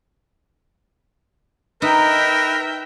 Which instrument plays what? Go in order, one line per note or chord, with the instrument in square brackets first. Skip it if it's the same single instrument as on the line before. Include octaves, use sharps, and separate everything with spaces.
[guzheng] D#4 [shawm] A#4 [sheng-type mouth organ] B4 [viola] E5 G5